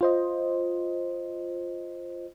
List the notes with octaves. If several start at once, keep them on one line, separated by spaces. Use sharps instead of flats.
F4 C5 D#5